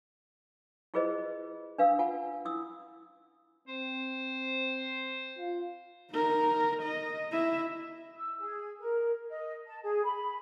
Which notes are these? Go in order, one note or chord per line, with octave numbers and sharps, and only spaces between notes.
E4 F4 G#4 B4 C5 D#5
D4 B4 F5 D#6 E6
F4 F#5 G#5
E4 D#6 E6
C4 C5
F4
D#4 A#4
D#5
E4 E5
E6
G#4
A#4
D#5
A5
G#4
B5